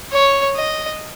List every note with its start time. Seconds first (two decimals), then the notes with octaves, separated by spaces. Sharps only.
0.12 C#5
0.56 D#5